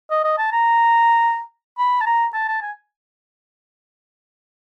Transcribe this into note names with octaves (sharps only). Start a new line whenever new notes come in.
D#5
D#5
A5
A#5
B5
A5
A#5
A5
A5
G#5